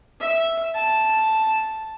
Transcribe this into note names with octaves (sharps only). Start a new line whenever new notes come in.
E5
A5